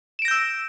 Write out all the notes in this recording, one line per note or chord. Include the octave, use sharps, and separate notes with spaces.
E6 G6 A#6 D7 E7